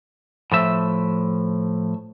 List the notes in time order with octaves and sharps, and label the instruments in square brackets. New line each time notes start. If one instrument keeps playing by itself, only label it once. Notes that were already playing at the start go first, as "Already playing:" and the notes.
[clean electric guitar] A2 F3 E5